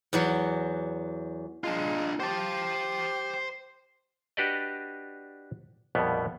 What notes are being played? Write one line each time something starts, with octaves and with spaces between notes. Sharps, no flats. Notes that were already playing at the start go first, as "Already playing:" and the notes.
E2 E3 F#3
G#3 D4 F4
G4 C5 A5
D4 F#4 G4 B4 D5 D#5
A#1 F2 B2 G3 B3